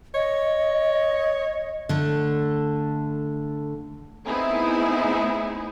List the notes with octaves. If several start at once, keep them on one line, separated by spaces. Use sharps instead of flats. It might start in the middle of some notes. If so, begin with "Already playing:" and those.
C#5 D#5
D3 A3
A3 B3 C4 D#4 E4 G#4